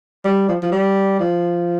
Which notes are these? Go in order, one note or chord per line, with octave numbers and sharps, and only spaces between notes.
G3
F3
F3
G3
F3